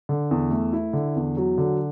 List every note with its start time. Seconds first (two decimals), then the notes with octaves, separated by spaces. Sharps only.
0.09 D3
0.31 E2
0.51 A3
0.73 E4
0.93 D3
1.16 E2
1.37 F#3
1.58 D3